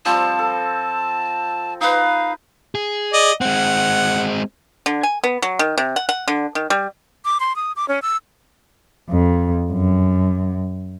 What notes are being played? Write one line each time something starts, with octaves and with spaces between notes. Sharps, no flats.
F3 G3 C4 A5
A4
D#4 B4 F5
G#4
D5 D#5
G#3 C4 F#5
D3
G#5
B3
F#3
D#3
C3
F#5
F#5
D3
D#3
G3
D6
C6
D#6
D6
C#4
E6
F2
F#2